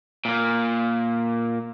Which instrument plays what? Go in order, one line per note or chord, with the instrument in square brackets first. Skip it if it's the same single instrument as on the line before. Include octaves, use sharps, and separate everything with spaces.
[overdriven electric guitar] A#2 A#3